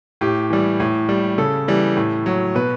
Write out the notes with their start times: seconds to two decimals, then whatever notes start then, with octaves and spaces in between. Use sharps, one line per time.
0.21 A2 G4
0.50 E3 G3
0.80 A2
1.09 G3
1.38 C#3 A4
1.68 E3 G3
1.97 A2
2.26 F#3
2.55 B2 B4